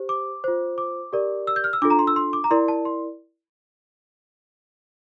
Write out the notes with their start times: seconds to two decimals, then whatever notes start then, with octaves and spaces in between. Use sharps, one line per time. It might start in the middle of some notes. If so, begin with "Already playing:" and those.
Already playing: G4 C5
0.09 D6
0.44 F4 C5
0.78 D6
1.13 G4 A#4 D5
1.47 E6
1.56 G6
1.64 F6
1.73 E6
1.82 D4 F4 A4 D6
1.90 A#5
1.99 C6
2.07 E6
2.16 C6
2.33 D6
2.44 A#5
2.51 E4 A#4 D5 C6
2.68 A5
2.85 C6